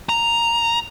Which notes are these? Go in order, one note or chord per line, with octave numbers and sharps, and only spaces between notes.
A#5